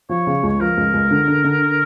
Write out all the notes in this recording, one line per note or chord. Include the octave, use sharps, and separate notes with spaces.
F3 C#5
C#3
C#2
C#5
F3 A#4
C#2
C#2
D3
D3
D3